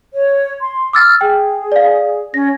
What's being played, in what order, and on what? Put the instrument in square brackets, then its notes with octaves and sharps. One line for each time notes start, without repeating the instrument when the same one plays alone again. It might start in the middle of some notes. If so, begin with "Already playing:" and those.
[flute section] C#5
C6
[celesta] D6 E6 A6 [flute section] F6
[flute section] G#4 [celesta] G5
[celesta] D5 F5
[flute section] C#4 C#5 [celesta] A#6